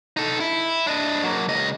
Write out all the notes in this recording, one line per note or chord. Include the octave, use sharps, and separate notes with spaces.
D#4 A4
E4
D4 D#5
F#3 A#3
C#2 D#5